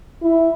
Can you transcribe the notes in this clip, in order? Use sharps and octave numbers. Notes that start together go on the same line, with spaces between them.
E4